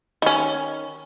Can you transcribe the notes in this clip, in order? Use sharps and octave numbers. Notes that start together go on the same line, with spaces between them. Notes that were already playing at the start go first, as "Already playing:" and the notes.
D#3 C#4